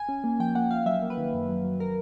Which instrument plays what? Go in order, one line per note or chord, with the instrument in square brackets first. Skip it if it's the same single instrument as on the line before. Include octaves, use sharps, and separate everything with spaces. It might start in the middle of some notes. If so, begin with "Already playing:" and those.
Already playing: [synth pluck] G#5
C#4
A#3
F3 G5
A#3 F#5
F3 F5
F#3 E5
A#3
B4
D#3
F#2
F#3
F#3
A#4